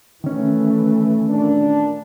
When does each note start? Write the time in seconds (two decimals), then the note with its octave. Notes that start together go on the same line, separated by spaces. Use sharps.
0.24 D#3 E3 A3 C#4
1.28 A#2 D4